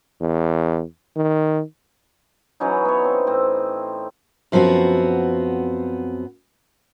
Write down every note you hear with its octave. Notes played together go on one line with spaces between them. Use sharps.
E2
D#3
E3 F#3 C#4 D#4
B3 C#5
C4
A2 C4
F#2 F3 B3 C4 F#4